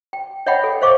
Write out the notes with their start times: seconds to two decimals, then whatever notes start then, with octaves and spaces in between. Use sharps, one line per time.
0.13 G5
0.46 C#5 D#5 E5 F#5 G5 B5
0.64 A4
0.82 C5 D#5 F5 C#6 D6